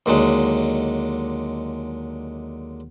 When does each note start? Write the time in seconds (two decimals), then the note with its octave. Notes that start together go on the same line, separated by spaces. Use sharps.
0.06 D#2 D3 F#3 G#3